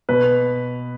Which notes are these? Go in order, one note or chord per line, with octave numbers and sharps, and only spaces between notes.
B2 B4